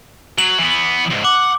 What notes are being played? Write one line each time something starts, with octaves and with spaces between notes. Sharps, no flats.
F#3 F#7
E3 B3
C#2 G#2
F#5 D6